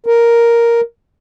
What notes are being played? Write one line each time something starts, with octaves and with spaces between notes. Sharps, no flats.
A#4